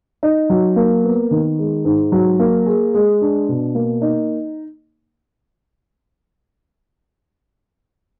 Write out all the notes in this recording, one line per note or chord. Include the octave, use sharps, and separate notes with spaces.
D#4
F#3
A#3
B3
D#3
G#3
G#2
F#3
A#3
G#4
G#3
D4
B2
A#3
D#4